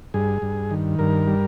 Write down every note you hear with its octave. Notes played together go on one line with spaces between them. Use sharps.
G2 G#4
G2
D#3
G2 A#4
G3